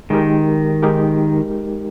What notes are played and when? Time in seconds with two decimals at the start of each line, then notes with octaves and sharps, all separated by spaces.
0.10 D#3 G#3 D#4 G4 A#4
0.83 G#3 D#4 G4 A#4